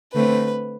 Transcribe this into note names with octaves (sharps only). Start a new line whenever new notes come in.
D3 A3 C4 B4